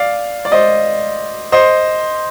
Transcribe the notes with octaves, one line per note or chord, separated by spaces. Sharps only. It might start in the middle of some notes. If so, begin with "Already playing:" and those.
Already playing: D5 F5
D5
C5 D#5
C5 D#5